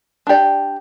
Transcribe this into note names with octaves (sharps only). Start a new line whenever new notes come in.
D4 G4 D5